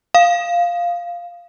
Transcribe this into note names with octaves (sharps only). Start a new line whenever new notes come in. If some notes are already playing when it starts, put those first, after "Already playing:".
F5